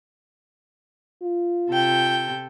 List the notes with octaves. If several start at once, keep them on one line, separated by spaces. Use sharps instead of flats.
F4
C3 A4 G5